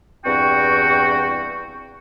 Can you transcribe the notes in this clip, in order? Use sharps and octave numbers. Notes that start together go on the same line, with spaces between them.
E2 G2 C4 F#4 G5 C#6